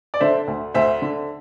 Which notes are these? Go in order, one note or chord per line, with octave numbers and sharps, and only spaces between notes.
D5
D3 C5 E5
D2
D2 C5 E5
D3